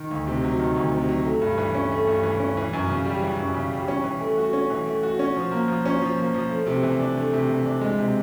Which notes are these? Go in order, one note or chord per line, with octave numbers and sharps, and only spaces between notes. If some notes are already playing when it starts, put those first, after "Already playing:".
Already playing: D#3
D2
C3
F#3
D#3
D2
C3
F#3
A3
G2
E3
C#4
A3
G2
E3
C#4
E3
F#2
C#3
G3
E3
F#2
C#3
G3
C#4
E3
A3
F#4
C#4
E3
A3
F#4
C#4
F3
A#3
F3
C#4
F3
A#3
F3
A3
C3
E3
D4
A3
C3
E3
D4
G#3
C3